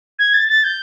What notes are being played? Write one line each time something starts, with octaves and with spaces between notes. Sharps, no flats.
G#6
A6
A6
G6